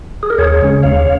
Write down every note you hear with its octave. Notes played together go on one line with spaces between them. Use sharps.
G#4
A#4
D#2 G#4 C#5
C#3 G#3 C#4
D#2 C#5 F5